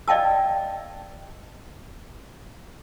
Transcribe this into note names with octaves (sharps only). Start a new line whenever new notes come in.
D5 D#5 F5 G5 A5 E6